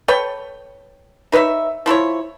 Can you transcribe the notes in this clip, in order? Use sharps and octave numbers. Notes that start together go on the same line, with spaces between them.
A4 B4 C#5 G5
D#4 B4 C#5 E5
F3 E4 A4 C#5